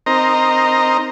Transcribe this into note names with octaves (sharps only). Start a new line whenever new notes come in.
C4 D#4 A#4 C5 D#5 A#5